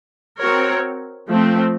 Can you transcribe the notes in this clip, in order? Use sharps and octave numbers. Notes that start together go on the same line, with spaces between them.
C4 F#4 A#4 C#5
F3 A3 C4